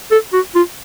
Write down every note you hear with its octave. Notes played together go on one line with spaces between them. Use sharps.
A4
F#4
F4